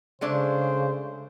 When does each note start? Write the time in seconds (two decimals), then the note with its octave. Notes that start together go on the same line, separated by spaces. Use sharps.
0.21 C#3 G#3 A3 D4 C5